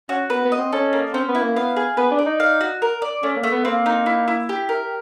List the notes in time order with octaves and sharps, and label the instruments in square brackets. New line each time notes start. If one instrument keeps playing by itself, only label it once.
[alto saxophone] C#4 [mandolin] F#4
[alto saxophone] B3 [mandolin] B4
[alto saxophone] B3
[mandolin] D#5
[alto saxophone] C4
[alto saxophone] C#4 [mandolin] A4
[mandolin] A#3
[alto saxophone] C4 [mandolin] C#4
[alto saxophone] B3
[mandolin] E4
[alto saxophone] A#3
[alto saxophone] B3 [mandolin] F5
[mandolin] G#4
[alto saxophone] B3 [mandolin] B4
[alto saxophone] D4
[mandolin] D5
[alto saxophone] D#4
[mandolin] F5
F#4
A#4
D5
[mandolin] A3 [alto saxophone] C#4
[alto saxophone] A#3
[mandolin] A3
[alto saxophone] B3
[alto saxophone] A#3 [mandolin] C4
[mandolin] D#4
E4
E4
G4
A#4